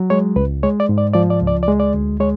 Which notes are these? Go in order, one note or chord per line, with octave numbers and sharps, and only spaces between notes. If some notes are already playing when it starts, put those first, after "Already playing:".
Already playing: F#3
G#3 C#5
C#2 B4
G#3 C#5
D5
G#2
D5
F3 D5
D5
C#2
D5
D5
G#3
D5
D2
G#3 C#5